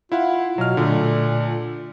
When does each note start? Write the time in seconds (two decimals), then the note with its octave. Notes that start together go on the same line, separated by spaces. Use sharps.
0.12 E4 F4 F5 F#5
0.58 B2 F#3 F6
0.77 A#2 D3 A3